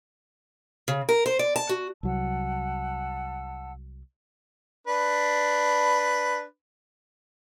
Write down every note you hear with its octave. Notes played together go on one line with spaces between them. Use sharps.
C#3
A#4
C5
D5
A5
F#4
C2 F#3 F#5 A5 E6
D4 B4